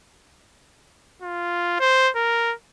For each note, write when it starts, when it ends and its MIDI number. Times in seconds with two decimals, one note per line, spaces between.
1.22 1.76 65
1.80 2.10 72
2.16 2.54 70